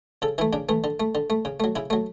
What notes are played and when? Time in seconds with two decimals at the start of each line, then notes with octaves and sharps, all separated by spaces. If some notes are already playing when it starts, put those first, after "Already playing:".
0.22 C#3 A4
0.38 E3 E4
0.41 A3
0.53 C#3 D4
0.69 E3 A3
0.84 D3
1.00 A3
1.15 D3
1.30 A3
1.45 C#3
1.60 F#3 A3
1.76 C#3 E4
1.90 F#3 A3